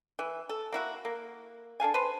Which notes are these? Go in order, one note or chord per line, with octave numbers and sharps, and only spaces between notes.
E3
A4
A#3 E4 F#4
A#3
D4 A4 F5 G#5
B4 C5